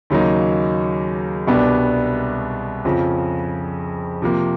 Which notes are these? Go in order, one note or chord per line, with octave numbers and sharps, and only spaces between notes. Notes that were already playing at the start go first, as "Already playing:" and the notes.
D#2 C#3 F#3 A#3 D#4
C2 B2 G3 B3 D4
F2 C#3 F3
C3 F3 A#3